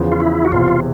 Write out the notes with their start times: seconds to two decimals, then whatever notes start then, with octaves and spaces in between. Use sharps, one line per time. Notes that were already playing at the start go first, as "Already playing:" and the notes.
Already playing: E2 C#3 F3
0.12 F4
0.20 E4
0.45 F#4
0.51 E1 E2 C3 F4